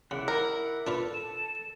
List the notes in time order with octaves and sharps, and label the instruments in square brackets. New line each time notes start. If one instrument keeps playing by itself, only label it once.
[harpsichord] C#3 [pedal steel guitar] E4 D5 F#5
[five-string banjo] A#4
[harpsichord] D4 F4 B4 [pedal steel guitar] A4
[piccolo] E7